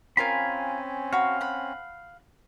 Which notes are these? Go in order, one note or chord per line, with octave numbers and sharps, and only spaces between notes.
C4 C#4 F4 A#4 F5 G#5 B5
F#4 F5 B5
F#5 B5